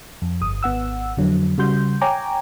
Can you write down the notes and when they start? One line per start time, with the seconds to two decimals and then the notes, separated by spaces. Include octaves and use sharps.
0.22 F2
0.41 G1 D#6
0.63 G#1 B3 F#5 E6
1.17 F2 D3 F#3
1.58 C#3 G3 F#4 C6 G6
2.01 C#5 G5 G#5 A#5 D6